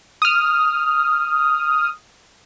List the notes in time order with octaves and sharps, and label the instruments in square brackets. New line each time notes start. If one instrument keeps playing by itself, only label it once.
[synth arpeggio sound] D#6 F6